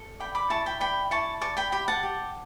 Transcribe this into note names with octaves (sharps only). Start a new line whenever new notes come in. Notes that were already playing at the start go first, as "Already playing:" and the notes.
Already playing: A4
D5 G5 B5
B5 D6
E4 A5 C#6
G5 B5
D5 G5 B5
E4 A5 C#6
D5 A5 C#6
G5 B5
G4 G5 B5
F#5 A5
G4